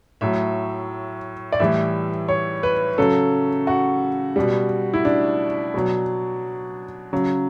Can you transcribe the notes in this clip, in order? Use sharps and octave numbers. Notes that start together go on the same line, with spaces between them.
A2 F#3 E5
D5
A2 E3 G3 E5
C#5
B4
C#3 F#3 A4
F#4
B2 G3
E4
D4
B2 F#3
C#3 F#3